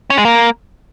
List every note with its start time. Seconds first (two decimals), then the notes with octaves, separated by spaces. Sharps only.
0.10 C#4
0.18 G#3
0.25 A#3